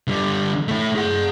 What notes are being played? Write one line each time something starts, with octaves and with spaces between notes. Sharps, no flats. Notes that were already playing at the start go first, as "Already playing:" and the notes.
D3 G3
A3 E4
G#4 F#5